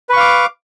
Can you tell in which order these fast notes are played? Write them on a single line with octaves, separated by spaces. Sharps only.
B4 C#6 F5 D6